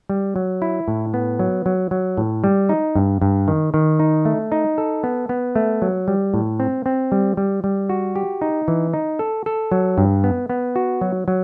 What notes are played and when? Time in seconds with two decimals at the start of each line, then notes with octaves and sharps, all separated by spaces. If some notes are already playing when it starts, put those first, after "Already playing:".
0.09 G3
0.36 F#3
0.62 E4
0.88 A2
1.14 B3
1.39 F#3
1.66 F#3
1.91 F#3
2.17 A2
2.44 G3
2.69 D#4
2.95 G2
3.22 G2
3.48 D#3
3.74 D#3
3.99 D#4
4.25 A3
4.52 D#4
4.78 A4
5.04 B3
5.29 B3
5.56 A3
5.82 F#3
6.08 G3
6.34 A2
6.60 C4
6.86 C4
7.12 G3
7.37 G3
7.64 G3
7.90 F#4
8.16 G4
8.42 D#4
8.68 E3
8.94 D#4
9.19 A4
9.46 A4
9.72 F#3
9.98 G2
10.24 B3
10.49 B3
10.76 F#4
11.01 F#3
11.28 F#3